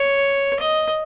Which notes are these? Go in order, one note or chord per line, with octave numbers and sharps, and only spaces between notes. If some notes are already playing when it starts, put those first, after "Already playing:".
Already playing: C#5
D#5